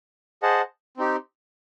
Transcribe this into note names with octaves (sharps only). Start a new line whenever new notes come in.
G#4 C5 D#5 F#5 A5
C4 D#4 G4